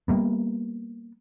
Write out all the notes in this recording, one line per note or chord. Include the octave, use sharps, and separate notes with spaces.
G3 A#3 B3